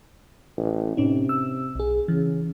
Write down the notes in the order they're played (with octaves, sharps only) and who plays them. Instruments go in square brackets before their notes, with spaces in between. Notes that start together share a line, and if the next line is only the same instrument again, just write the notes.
[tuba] A1
[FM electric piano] A2 C#4 D#4 [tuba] C3
[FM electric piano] E6
B1 G#4
[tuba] C#3 [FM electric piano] E3